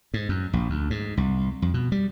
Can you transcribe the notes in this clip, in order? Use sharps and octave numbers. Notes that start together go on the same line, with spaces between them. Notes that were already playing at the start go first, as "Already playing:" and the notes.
G#2
F#2
A#1
D2
G#2
C2
F2
B2
G3